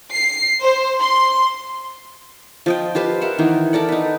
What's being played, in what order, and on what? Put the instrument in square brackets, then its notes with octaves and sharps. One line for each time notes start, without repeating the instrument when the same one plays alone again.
[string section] C7
C5
C6
[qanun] F3 D#5 G5
F4 G4 B4 C5
A#4 E5 F#5
D#3 E3 A#3 D#4
A4 A#4 D5 F#5
D#4 B4